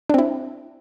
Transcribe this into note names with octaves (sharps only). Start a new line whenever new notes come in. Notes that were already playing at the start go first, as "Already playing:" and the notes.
C4 D4 E4